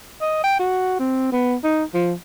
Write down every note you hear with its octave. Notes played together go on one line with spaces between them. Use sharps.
D#5
G5
F#4
C4
B3
D#4
F3